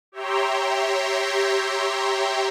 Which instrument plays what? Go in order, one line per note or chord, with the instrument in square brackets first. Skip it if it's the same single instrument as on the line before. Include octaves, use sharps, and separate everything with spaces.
[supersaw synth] G4 C#5 E5 G5 A#5 C6